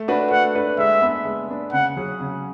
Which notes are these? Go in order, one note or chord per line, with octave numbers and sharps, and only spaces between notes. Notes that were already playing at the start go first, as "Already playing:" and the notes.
Already playing: A3
D4 F#4 B4
A3 F#5
D4 F#4 B4
G#3 E5
B3 D4
G#3
B3 D4
C#3 F#5
F#3 C#4 G#4
C#3